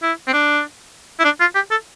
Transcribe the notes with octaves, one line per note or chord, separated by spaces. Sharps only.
E4
C4
D4
E4
D4
F4
G4
A4